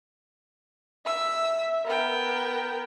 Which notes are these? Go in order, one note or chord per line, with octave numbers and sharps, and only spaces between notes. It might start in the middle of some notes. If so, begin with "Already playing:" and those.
E5 E6
B3 A#4 G5
A#4